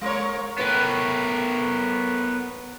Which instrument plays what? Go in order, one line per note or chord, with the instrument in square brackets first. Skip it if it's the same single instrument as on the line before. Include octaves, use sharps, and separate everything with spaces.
[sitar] G#3 A#4 C#5
[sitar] A2 B4 [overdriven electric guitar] B3 A#4